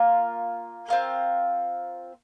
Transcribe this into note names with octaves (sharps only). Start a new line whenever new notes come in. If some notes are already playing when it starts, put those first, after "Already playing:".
Already playing: A#3 F4 A#4
C4 F4 A#4